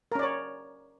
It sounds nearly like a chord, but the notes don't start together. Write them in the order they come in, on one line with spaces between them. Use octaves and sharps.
A#4 C#4 D5 C#5